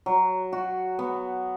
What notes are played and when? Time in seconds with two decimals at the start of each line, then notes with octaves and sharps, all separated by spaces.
0.06 F#3
0.53 F#4
0.99 B3